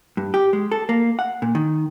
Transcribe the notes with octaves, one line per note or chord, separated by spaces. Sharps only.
G2
G4
G#3
A4
A#3
F#5
A#2
D#3